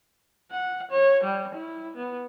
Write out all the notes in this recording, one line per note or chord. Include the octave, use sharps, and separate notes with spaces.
F#5
C#5
G3
E4
B3